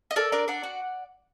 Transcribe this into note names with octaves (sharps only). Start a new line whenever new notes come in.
D#5
A4 A#4 D5
D4 A#4 D5
D4 D5 F#5
F#4